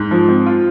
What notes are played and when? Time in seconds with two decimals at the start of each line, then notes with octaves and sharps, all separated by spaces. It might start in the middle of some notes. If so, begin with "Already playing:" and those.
Already playing: G#2
0.11 F3
0.29 C4
0.46 F4